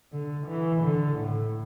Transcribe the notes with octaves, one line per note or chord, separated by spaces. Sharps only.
D3
E3
D3
A2